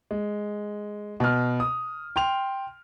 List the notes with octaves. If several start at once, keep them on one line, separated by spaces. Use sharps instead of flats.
G#3
B2 F6
D#6
G5 C6 F7